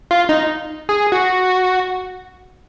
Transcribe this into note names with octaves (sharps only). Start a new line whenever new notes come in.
F4
D#4
G#4
F#4